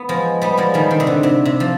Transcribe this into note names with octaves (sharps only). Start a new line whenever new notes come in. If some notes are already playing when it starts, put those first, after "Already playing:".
Already playing: B3
F3 G#3
G3 B3
F3 G#3
D#3 G3
D#3
C3
D3
C3
C3
F3